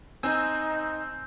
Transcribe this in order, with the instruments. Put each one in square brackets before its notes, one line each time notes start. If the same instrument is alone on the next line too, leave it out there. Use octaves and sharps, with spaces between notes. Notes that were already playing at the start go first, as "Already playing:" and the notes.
[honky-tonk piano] C4 G#5 [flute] D#4 [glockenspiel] E6 G6